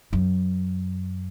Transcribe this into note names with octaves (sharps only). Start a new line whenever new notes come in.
F#2